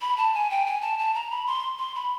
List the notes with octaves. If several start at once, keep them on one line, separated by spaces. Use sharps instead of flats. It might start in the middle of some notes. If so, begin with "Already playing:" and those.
B5
A5
G#5
G5
G#5
A5
A5
A#5
B5
C6
C6
B5